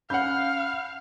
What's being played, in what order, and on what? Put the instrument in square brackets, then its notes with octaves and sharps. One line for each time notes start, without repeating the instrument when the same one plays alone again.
[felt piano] C#4 B5 [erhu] F5 [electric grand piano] F#5 G6